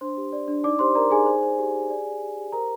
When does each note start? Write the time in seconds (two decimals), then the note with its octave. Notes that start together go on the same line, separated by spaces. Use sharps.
0.01 D4 C5 C6
0.17 G4
0.32 D5
0.48 D4
0.64 D#4 D5 D6
0.79 G4 C5 C6
0.95 A#4 D5 A#5
1.11 D#4 G#4 G#5
1.26 C5
1.43 C5
1.59 G4
1.74 G4
1.90 D5
2.06 D5
2.22 G4
2.37 G4
2.52 A#4 C5 A#5